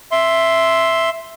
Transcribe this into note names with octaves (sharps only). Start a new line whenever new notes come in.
E5 C6